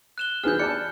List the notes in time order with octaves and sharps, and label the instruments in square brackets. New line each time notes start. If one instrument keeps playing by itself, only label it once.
[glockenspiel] F#6 E7 G7
[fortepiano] E3 B3 G#4 [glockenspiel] F6 G6
[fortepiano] D5 A5 [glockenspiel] C#7